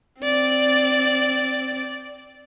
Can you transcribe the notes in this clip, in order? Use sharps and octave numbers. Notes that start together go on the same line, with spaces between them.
C4 D5